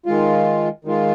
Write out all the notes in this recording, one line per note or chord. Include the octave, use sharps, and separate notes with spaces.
D#3 G#3 F4
D#3 G#3 F4